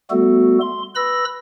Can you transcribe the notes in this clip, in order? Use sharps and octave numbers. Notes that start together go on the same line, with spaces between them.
G3 A3 B3 F#4 A4
C6
B4 B5 E6 A#6